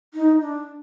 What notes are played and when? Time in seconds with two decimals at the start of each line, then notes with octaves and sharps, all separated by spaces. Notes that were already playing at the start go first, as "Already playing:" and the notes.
0.14 D#4
0.41 D4